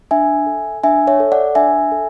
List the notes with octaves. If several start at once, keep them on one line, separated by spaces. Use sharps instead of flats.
D4 E5 G#5
A4
D4 E5 G#5
C#5 E5
A4
D5 F#5
D4 E5 G#5
A4